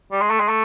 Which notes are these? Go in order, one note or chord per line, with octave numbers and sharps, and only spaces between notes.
G3
G#3
A3
G#3
A3